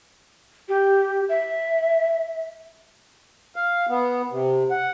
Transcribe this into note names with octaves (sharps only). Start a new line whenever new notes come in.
G4
E5
F5
B3
C3
F#5